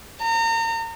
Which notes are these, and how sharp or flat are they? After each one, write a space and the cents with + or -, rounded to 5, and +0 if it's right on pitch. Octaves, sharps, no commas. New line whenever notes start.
A#5 -35